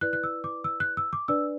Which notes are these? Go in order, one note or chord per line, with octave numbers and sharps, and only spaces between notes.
E4 B4 D5 F#6
F#6
E6
D6
E6
F#6
E6
D6
D4 B4 D5 E6